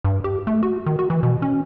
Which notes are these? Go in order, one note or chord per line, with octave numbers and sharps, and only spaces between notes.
G2
G4
A3
F#4
D#3
F#4
E3
B2
C#4